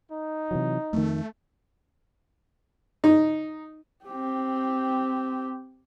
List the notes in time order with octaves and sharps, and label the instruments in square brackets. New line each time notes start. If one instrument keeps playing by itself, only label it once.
[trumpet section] D#4
[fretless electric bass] C3 E3 F#3
[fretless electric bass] F2 D#3 [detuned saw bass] A3
[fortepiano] D#4
[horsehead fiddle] C4 G4